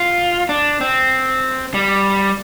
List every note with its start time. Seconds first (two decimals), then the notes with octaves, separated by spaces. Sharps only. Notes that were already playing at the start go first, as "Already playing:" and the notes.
Already playing: F4
0.49 D4
0.81 C4
1.74 G3